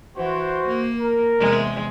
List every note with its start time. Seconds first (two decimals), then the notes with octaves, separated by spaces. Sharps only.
0.17 E3 F#4 C5
0.67 A#3
0.98 A#4
1.39 E2 C3 G#3